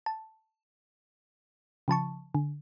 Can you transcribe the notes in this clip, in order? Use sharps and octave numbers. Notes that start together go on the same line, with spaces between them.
A5
C#3 F3 A5 C#6
D3